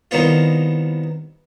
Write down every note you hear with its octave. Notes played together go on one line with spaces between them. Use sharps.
C2 D#3 B3 F4